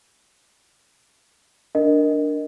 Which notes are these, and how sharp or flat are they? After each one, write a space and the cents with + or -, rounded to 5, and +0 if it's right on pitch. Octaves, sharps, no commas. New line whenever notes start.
D4 +0 A#4 +0 D#5 +0